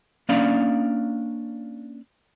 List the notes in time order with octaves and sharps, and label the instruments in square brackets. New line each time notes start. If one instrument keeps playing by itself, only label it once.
[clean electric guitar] A#3 C#4 D4 D5 F5